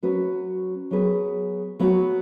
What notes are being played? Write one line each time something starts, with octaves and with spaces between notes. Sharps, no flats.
F#3 C#4 F#4 B4
F#3 B3 G#4 B4
F#3 B3 F#4